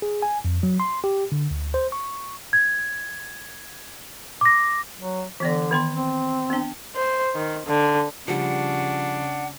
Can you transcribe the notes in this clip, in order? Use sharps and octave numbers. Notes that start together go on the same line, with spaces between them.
G#4
G#5
F2
F#3
C6
G4
D3
D2
C5
C#6
G#6
D6 A#6
F#3
D3 E3 B3 D5
D#3 B3 C6
C4
B3 D4
C5
D#3
D3
C#3 F3 G3 D4 F#5